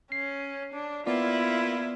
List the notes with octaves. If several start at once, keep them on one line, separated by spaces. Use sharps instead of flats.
C#4 C7
D4
A#3 B3 E4 F4 D5